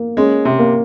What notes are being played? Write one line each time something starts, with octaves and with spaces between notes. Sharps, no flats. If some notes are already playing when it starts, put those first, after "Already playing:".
Already playing: A#3
G#3 C#4
C3
A#3